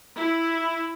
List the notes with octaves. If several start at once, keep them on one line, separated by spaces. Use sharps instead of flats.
E4